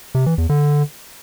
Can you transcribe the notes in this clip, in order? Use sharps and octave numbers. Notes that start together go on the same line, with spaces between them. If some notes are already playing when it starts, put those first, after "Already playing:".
C3
E3
E2
D3